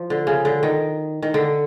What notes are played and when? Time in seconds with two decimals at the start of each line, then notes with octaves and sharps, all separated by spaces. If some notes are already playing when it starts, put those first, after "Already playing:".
Already playing: F3
0.10 D3
0.27 C#3
0.45 D3
0.63 D#3
1.22 D#3
1.34 D3